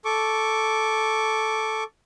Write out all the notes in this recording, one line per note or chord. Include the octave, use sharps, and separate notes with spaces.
A4 C#6 D6